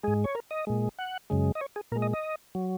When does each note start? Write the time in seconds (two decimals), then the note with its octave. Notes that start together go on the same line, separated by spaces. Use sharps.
0.03 G#2 G#3 G#4
0.24 C#5
0.35 A#4
0.51 D#5
0.67 A#2 G#3
0.99 F#5
1.30 F#2 C#3 G#3
1.55 D#5
1.61 C#5
1.76 G#4
1.92 A#2 A#4
1.96 G#3
2.02 D#5
2.13 D#5
2.55 F#3